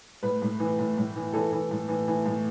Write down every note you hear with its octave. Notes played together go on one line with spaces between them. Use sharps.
A2 B4
A2
E3
A2
A2
E3
E3 A4
E3
A2
E3
E3
A2